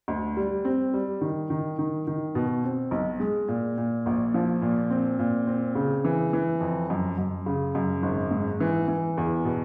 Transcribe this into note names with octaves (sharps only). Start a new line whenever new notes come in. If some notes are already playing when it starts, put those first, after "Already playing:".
D2
G3
C4
G3
D#3
D#3
D#3
D#3
B2
C4
B1
G#3
A#2
A#2
A#1
F3
A#2
C4
A#2
C4
C#3
E3
E3
F2
F#2
F#2
C#3
F#2
G#1
G#2
E3
E3
E2
B2